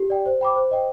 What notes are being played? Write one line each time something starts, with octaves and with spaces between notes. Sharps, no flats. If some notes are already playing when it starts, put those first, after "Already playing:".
Already playing: G4
D5 G5
C5
G5 B5 D6
C5
D#5 G5